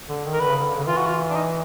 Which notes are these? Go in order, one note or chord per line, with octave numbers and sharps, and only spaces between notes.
D3
D#3
A#4
D3 B4
C#3
D3
C#3
E3 F4
F#4
F4
D4
D#4